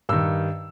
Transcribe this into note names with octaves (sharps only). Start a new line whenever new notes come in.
G2 D#3 E6